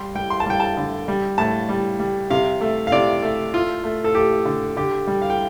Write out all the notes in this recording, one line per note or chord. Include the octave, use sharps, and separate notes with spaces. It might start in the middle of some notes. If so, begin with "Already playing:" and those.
Already playing: G3 C6
G3 G5
C6
A5
G3 G5
A5
D3
G3
A2 A5
G3
G3
C3 F5
A3
F5
C3 D5
A3
A3 F4
A3
A4
A3 G4
D3
D3 G4
G3
F5
G5